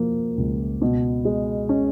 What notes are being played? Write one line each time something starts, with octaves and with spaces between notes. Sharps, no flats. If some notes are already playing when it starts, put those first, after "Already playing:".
Already playing: F3 A#3
C#2
B2
G#3
C#4